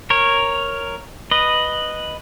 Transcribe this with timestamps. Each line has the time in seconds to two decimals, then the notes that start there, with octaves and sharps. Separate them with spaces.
0.10 A#4 C#5
1.31 B4 D#5